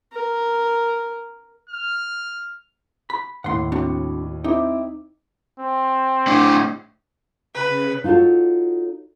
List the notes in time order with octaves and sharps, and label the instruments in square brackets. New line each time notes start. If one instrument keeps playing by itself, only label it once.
[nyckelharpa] A#4
[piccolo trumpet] F6
[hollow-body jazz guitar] B5
[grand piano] D#2 A2 [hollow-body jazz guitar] F#5 C6
[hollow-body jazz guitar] C4 D4 F#4
[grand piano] C4 E4 D6 [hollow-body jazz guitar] D#4
[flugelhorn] C4
[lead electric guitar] A2 D4
[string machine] C#3 [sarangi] B4
[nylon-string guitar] D#4 F4 F#4 A4 C#5